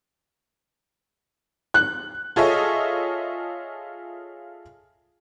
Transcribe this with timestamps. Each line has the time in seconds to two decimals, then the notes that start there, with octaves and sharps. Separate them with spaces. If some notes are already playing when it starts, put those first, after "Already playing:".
1.74 F#6
2.36 F4 G#4 A4 C#5 D#5 E5